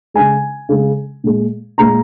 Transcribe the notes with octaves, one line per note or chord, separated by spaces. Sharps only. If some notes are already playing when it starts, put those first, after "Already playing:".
C#3 G#3 G#5
C#3 G#3
A#2 G#3
A#2 G#3 A#5